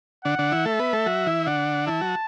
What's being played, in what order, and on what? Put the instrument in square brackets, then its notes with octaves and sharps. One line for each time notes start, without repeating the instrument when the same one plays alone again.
[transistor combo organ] D3 D4 [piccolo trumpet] F#5
[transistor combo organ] D3 D4
E3 E4
[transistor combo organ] A3 A4 [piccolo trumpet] E5
[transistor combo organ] B3 B4
A3 A4
F#3 F#4
E3 E4
[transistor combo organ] D3 D4 [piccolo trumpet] F#5
[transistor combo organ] E3 E4 [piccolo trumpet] A5
[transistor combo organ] F#3 F#4